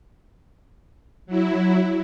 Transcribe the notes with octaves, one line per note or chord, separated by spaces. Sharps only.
F#3 E4